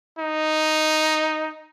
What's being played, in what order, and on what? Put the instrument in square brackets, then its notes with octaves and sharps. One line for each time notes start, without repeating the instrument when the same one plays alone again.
[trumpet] D#4